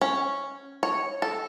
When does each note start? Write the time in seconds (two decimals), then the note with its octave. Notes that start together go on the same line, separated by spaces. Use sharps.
0.01 C#4
0.83 C#5
1.22 A4